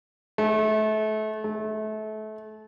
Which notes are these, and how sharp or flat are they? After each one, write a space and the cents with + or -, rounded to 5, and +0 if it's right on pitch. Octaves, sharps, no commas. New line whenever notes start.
A3 -30
A3 -30